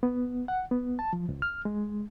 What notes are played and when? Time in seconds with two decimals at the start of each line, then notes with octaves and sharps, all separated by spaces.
0.03 B3
0.48 F#5
0.71 B3
0.99 A5
1.13 F3
1.29 C#2
1.42 F6
1.65 G#3